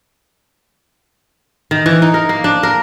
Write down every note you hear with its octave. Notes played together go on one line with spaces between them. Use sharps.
D#3
E3
D#4
A#4
A#3
D4
A#4